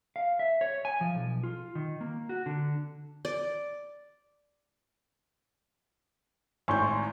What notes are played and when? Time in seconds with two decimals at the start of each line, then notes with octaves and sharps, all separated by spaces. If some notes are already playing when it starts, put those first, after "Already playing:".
0.16 F5
0.39 E5
0.61 C#5
0.85 G#5
1.01 F3
1.15 B1
1.43 F4
1.75 D#3
2.01 A#3
2.29 F#4
2.46 D3
3.25 D5
6.68 G#1 A2 G#5 C6 C#6 G6